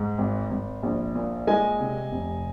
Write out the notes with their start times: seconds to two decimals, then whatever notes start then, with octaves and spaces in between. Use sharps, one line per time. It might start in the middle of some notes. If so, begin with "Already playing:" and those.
Already playing: G#2
0.18 G#1
0.51 G#1
0.83 A#1
1.15 A#2
1.47 G#3 D#5 G#5
1.79 C3
2.12 F1